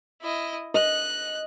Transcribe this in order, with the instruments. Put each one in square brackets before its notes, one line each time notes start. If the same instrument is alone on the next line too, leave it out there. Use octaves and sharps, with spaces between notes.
[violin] E4 D#5
[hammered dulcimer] D#5 [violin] F#6